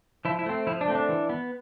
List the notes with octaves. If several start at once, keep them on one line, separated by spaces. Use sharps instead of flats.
F3 E4
E4
A3 C4
F3 E4
D4
A3 C4
D4
E3
B3